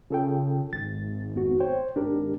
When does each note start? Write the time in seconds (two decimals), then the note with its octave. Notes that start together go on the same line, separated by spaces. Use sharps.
0.10 C#3 F4 A4 G5
0.73 G#1 A6
1.35 F2 B3 F#4
1.60 C5 C#5 G5
1.96 G#1 D4 G4 A#4